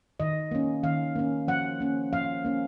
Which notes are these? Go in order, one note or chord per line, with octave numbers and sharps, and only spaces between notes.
D#3 D#5
A#3 C#4
D#3 F5
A#3 C#4
F3 F#5
A#3 C#4
F3 F5
A#3 C#4